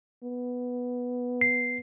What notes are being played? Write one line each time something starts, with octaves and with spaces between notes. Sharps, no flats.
B3
C7